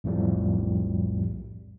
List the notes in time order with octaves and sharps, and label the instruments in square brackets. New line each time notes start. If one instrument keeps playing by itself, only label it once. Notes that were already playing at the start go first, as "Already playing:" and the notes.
[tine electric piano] B1 F2 A2 F3 G3